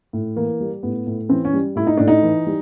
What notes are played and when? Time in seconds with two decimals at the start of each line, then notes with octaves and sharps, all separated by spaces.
0.13 A2
0.36 E3 A#3
0.60 G3
0.83 A2 B3
1.07 A2
1.29 E3 C4
1.45 C#4
1.53 G3
1.76 A2 E4
1.87 D#4
1.97 A2 D4
2.08 D#4
2.23 E3
2.46 G3